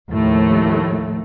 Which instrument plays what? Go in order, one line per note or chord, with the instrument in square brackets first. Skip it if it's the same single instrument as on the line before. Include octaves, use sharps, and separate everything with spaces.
[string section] D#2 A2 F3 A3